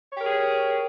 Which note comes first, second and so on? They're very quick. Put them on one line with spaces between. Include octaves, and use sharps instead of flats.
C#5 G4 A#4 G#4